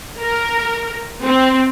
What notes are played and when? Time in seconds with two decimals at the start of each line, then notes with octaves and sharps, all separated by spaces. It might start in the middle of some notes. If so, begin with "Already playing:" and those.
0.20 A#4
1.25 C4